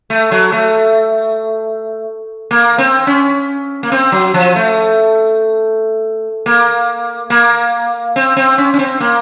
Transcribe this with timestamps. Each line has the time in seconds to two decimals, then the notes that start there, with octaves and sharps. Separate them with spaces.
0.10 A3
0.32 F#3
0.52 A3
2.51 A#3
2.78 C4
3.07 C#4
3.83 A#3
3.92 C4
4.12 F#3
4.34 F3
4.56 A3
6.46 A#3
7.30 A#3
8.16 C4
8.37 C4
8.58 C#4
8.74 C#4
8.79 C4
9.00 A#3